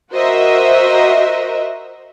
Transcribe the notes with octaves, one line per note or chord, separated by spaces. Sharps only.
F#4 A#4 C5 D#5 E5